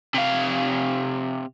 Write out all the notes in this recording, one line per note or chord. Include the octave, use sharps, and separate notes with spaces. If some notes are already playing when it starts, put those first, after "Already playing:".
C3 F5